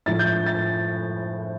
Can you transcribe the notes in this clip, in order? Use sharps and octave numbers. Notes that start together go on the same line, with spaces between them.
A2 F3 A6
G6
A6